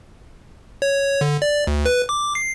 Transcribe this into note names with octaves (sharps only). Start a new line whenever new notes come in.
C#5
D3
D5
D2
B4
D6
C7